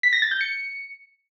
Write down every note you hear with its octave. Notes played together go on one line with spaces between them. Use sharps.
B6
A#6
A6
G6
C#7